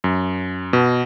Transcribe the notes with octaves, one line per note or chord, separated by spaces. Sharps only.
F#2
B2